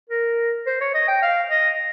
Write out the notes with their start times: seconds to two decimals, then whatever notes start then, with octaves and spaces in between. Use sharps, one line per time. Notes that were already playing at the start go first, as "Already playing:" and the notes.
0.10 A#4
0.67 C5
0.81 C#5
0.94 D#5
1.08 G5
1.22 F5
1.50 D#5